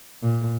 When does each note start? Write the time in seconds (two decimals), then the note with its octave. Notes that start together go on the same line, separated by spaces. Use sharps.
0.23 A#2